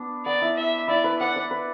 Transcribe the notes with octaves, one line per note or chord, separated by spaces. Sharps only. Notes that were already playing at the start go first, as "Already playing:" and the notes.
Already playing: B3 D4
B3 D5
E4
E5
E4 D5
B4
D5 F#5
D5
B4